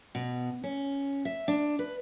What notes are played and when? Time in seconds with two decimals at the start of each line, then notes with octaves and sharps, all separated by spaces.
0.15 B2
0.64 C#4
1.25 E5
1.48 D4
1.79 B4